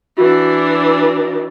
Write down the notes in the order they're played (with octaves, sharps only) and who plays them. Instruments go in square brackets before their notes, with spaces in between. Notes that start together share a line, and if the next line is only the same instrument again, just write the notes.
[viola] E3 D4 [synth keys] F#4